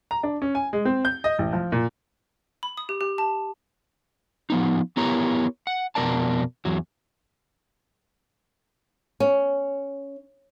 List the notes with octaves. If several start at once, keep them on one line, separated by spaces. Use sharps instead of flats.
A#5
D4
C#4
G#5
G#3
C4
G6
D#5
A1
F3
A#2
B5
D#6
G4
G4
A5
F3 B3 D#4
B3 E4 G4 A#4 C#5 A#5
F#5
F2 B2 C#4 A#4 D5 A5
E2 F#3
C#4